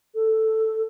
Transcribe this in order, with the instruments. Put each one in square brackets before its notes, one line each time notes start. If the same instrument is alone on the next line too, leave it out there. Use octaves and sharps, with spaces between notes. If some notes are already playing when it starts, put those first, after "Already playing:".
[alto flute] A4